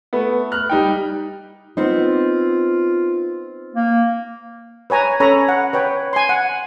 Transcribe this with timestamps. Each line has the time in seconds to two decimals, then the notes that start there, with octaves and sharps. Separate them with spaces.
0.13 A3 B3
0.52 F6 F#6
0.70 G3 D#4 G5
1.77 B3 C4 D#4 F4
3.75 A#3
4.90 B4 C#5 G#5 A#5
5.20 C#4 A4 C#5 A#5 B5
5.48 F#5
5.73 B4 C#5 G5
6.13 G#5 C6
6.29 F#5